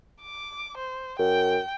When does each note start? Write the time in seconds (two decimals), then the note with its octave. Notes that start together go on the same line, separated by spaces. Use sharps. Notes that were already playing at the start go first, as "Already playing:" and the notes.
0.22 D6
0.78 C5
1.19 F#2 G5